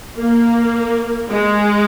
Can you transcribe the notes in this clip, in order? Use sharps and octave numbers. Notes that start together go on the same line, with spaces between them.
A#3
G#3